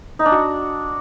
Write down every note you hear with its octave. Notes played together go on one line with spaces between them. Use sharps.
D#4
D4
F#4